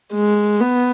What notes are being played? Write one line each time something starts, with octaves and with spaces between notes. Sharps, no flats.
G#3
B3